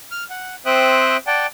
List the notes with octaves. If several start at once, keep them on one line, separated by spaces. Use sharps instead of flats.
F6
F#5
C4 C5 E5 G5 D#6 F#6
D5 F#5 G5 A5